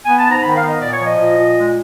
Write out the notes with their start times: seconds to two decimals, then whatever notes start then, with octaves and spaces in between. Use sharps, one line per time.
0.05 B3 G#5
0.19 A5
0.25 G#2
0.31 A#5
0.43 D#3 B5
0.56 F5
0.62 B3
0.68 D#5
0.81 A#2 D5
0.94 C#5
1.00 F3
1.06 D#5
1.18 A#2
1.37 A#2
1.56 G#3